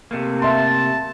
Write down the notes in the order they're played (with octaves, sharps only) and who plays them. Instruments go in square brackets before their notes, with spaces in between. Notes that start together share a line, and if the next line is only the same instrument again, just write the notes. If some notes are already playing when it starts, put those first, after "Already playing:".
[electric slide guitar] C3 A3 A#3
[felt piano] E5 C6 [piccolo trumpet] A5